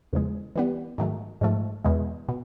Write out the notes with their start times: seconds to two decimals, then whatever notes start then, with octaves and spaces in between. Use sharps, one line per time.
0.13 E2 C#3 F3 G#3
0.56 E3 G3 B3
0.98 G#2 D#3 F#3 A3
1.41 G#2 F3 A3
1.85 E2 B2 G#3
2.29 B2